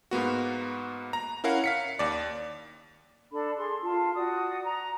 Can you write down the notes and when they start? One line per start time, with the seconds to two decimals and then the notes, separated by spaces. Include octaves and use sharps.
0.11 G#2 A#3 B3 F#4
1.13 A#5
1.44 C#4 E4 A#4 F5 F#5
1.64 F5 B6 C#7
1.99 D#2 D5
3.31 D4 A4 B5
3.56 G#4 C6
3.82 F4 A5
4.15 F#4 D5 D#6
4.65 A#5